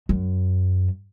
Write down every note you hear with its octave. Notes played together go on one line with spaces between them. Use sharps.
F#2